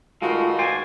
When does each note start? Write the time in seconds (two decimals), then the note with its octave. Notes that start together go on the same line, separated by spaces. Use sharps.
0.22 G2 D#3 G#3 A3 F4 F#4
0.59 C5 D5 G#5